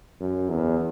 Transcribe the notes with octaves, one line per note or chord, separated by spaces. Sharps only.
F#2
E2